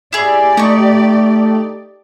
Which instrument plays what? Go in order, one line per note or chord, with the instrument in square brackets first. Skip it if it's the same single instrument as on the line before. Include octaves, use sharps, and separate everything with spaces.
[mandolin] E4 G#4 [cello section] G4 D5
[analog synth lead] A3 [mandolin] D#4 C#6